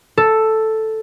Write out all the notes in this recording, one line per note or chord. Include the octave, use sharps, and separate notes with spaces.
A4